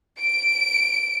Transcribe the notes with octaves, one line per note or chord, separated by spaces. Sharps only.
D7